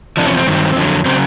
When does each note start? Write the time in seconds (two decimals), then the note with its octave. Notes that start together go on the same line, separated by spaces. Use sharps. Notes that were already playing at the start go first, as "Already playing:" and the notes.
0.17 E2 C3 F3 D4
0.27 C#4
0.37 C4
0.46 G2 D#3 F#3
0.76 F2 D3 F#3
1.05 C#3 F#3 C4